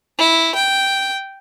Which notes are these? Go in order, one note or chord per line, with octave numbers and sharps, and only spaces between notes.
E4
G5